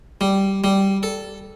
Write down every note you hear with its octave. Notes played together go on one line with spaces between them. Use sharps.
G3
G3
A4